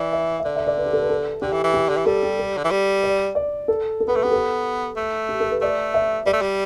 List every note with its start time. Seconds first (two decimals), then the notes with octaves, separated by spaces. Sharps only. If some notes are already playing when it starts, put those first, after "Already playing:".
Already playing: E3 D5
0.13 E5
0.40 E5
0.45 D3 D5
0.56 E5
0.67 D5
0.78 B4
0.86 G4
0.93 A4
1.02 B4
1.10 A4
1.42 D3 G4
1.53 E3
1.64 E3
1.74 G4
1.89 D3
1.97 E3
2.06 G3 A4
2.23 G4
2.39 A4
2.57 D3
2.65 E3
2.71 G3
3.03 D5
3.35 D5
3.68 A4
4.00 A4
4.08 B3 B4
4.15 A3 A4
4.23 B3 G4
4.32 A4
4.97 A3
5.29 G4
5.40 A4
5.51 B4
5.61 A3 D5
5.94 E5
6.26 G3 D5
6.33 A3
6.42 G3